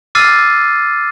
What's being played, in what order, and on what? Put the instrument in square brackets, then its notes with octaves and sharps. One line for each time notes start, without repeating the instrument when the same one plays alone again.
[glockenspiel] D6 E6 F6 A6 C7 D#7